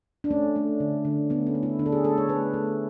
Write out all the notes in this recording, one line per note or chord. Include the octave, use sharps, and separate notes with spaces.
D4
A3 C#4
A3
D3
D3
A3 B3
C#4
A3
E4
D3 D4
A4
G#4
A3 A4
C#5
A3 B4
A3